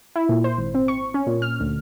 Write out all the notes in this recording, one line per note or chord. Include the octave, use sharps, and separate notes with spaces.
E4
A#2
C5
G#1
C4
C#6
C#4
A#2
F6
D2